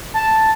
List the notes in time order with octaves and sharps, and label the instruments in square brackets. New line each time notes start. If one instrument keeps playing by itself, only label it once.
[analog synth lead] A5